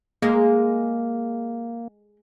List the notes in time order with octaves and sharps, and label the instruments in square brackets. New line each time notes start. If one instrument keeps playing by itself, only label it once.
[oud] G#3 [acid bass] A#3